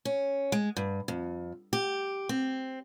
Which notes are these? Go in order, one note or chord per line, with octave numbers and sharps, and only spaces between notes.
C#4
G#3
G2
F2
G4
C4